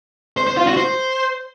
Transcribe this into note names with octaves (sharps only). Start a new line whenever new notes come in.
C5
C5
F4
F#4
C5